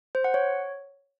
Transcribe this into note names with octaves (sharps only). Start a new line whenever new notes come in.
C5
F#5
C#5